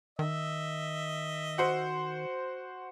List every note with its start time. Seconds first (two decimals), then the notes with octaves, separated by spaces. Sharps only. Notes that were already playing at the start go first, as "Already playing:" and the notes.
0.19 D#3 D#5 E5
1.58 F#4 C5